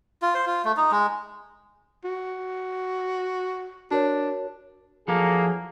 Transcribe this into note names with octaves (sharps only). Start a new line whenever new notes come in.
F4
C5
F4
A3
D#4
G#3
F#4
D4 F#4 A#4 C#5
E2 F3 F#3 A#3 G#4 A4